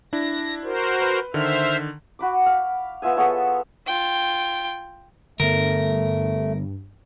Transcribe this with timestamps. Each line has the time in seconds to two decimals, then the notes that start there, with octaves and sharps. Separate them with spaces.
0.13 D4 E4 A#6
0.64 F#4 A#4 C5
1.02 B4
1.34 D3 D#3 C5 E5 F6
2.19 F#4 B5 D6
2.46 F5
3.02 B3 F4 E5 G#5
3.17 B3 G#4 A4 C#5
3.87 F4 G5
5.40 G2 D3 A3 B3 A#4